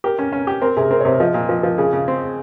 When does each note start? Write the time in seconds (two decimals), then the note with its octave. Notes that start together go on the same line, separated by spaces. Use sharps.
0.04 G4 A#4
0.19 C#4
0.32 C#4
0.47 G4
0.61 C4 A#4
0.77 C3 G#4
0.91 C4 A#4
1.00 C#5
1.05 C3 C5
1.20 F3 D#5
1.34 A#2
1.49 F3
1.63 F3
1.78 C#3 G#4
1.93 C#3
2.08 C4